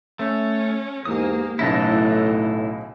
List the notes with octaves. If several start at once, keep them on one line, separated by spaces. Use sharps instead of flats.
A3 C#4
E2 G#2 A#3 G4 D#6
B1 A2 C#3 E3 D#4 E4 D#5 A5